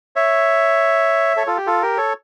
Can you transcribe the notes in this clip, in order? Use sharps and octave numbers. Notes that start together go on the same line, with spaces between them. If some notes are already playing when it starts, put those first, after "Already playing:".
C#5 E5
A4 C#5
F4 A4
G4
F4 A4
G4 A#4
A4 C#5